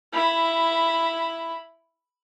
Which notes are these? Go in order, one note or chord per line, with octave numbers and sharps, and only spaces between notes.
E4 B5